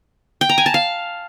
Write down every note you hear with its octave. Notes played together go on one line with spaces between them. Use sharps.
G5
A#5
G#5
A5
F5